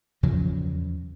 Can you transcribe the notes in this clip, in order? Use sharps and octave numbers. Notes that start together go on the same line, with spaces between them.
E2 C#3 F3 F#3